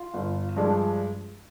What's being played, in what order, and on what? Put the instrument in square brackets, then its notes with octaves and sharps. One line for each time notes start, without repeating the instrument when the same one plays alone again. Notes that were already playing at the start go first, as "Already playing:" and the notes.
Already playing: [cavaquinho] F4
[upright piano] G1
G2 F3 G#3 D4